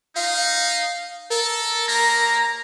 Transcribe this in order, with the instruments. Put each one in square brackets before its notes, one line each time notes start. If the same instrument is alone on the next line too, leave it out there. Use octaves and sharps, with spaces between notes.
[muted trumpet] D#4 [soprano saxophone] F5
[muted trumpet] A4 [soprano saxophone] A#4
[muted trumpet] A#3 [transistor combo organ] A#5